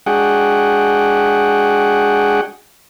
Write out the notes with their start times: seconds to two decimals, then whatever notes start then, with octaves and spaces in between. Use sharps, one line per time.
0.06 G#3 D4 F#4 G#4 F#5 G5